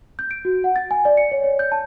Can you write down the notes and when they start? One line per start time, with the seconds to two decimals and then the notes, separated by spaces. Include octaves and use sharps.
0.19 G6
0.31 D7
0.45 F#4
0.64 F#5
0.76 A6
0.91 G#5
1.05 D5
1.17 C#7
1.32 C#5
1.44 C#5
1.59 G6
1.72 A5